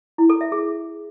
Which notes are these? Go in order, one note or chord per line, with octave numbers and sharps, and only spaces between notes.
E4
A4
E5
G#4